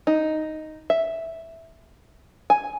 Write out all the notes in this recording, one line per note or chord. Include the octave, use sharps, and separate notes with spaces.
D#4
E5
G#5